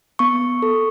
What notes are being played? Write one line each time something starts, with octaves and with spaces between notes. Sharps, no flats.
B3 C#6
A4